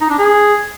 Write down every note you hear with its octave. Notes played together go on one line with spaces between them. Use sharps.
D#4
D4
G#4